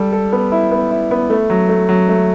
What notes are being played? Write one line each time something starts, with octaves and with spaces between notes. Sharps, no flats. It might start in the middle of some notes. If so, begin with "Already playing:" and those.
Already playing: G3 A4
A4
B3
E4
B3
E4
B3
A3
F#3
A3
F#3
A3